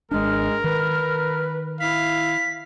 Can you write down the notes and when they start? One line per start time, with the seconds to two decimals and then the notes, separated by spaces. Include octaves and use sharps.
0.11 G#1 G#3 D4 A#4 F6
0.64 D#3 B4
1.80 E4 F5 B6